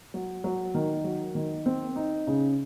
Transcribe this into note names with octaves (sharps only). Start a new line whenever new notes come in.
F#3
F#3
D#3
F#3
D#3
C4
D#4
C#3